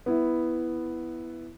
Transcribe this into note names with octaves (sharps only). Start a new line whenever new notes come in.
B3 E4